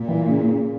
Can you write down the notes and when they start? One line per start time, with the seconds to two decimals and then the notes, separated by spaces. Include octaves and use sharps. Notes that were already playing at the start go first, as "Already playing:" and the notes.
Already playing: A#2
0.08 E3
0.28 C#3
0.49 C#3